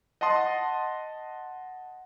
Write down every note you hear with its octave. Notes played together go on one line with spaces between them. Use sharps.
D#5 F#5 A5 C6 D#6